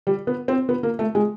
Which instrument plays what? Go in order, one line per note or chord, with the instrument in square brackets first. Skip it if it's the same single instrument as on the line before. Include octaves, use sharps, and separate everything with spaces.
[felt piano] G3
B3
C4
B3
A#3
A3
G#3